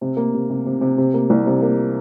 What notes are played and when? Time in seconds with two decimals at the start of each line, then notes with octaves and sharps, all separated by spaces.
0.01 C3
0.17 A#3
0.34 C3
0.50 C3
0.66 C3
0.81 C3
0.98 C3
1.14 A#3
1.30 C2
1.46 C3
1.62 A#3